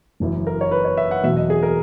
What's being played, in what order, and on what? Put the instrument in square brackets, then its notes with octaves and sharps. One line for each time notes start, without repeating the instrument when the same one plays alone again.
[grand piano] F#1 F#2 E3
A#4
C#5
B4
C#5
E5
F#5
E2 B2 F#3 E5
D#5
G#4
A#4